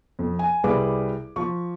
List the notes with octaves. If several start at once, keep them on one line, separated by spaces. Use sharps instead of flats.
F2
G#5
C2 G3 G#4 B4 D6
F3 C#6